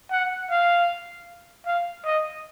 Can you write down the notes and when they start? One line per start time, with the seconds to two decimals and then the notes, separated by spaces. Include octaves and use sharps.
0.11 F#5
0.51 F5
1.66 F5
2.05 D#5